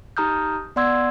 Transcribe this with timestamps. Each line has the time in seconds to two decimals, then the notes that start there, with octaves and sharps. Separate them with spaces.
0.17 D#4 G4 A#5 D#6 F6 G6
0.76 B3 D5 F#5 C6 E6 G#6